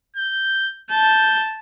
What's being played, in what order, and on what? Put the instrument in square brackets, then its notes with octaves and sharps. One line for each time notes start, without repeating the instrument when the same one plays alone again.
[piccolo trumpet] G6
[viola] A5 [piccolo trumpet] G6